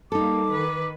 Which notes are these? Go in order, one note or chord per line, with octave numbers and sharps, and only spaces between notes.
G3 A#3 D#4 A4 D6
D#3 B4